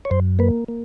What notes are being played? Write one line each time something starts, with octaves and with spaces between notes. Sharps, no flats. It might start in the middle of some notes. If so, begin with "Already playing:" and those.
C#5
F#2 C5
A#3 B4
A#3